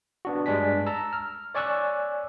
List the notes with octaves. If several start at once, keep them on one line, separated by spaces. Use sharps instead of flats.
B3 D4 F#4
G2 G3 G#3 D4 G#5 B6
A5 A#5 E6
F6
C#5 D5 G#5 C#6 E6 F#6